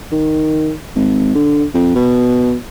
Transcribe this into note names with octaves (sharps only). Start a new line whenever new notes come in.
D#3
G#1
D3
F2
B2